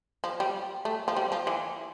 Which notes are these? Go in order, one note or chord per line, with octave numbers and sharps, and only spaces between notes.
F3
G3
A3
F3
G3
F3
E3